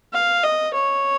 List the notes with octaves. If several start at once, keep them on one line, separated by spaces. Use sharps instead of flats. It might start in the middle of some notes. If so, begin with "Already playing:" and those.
F5
D#5
C#5